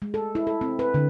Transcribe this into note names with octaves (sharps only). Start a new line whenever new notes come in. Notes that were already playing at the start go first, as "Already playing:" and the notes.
G#3
A4
E4
A4
C4
B4
D3